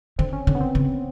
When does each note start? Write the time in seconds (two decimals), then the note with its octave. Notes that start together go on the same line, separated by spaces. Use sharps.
0.18 D3 C4
0.33 C#4
0.47 D3
0.55 B3
0.61 C4
0.75 C#3